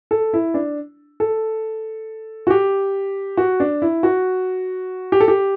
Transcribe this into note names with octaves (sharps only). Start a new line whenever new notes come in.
A4
E4
D4
A4
F#4
G4
F#4
D4
E4
F#4
G4
A4
G4